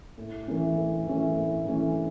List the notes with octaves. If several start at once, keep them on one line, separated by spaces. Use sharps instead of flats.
A2
E3 A3 C#4
A2
E3 A3 C#4
A2
E3 A3 C#4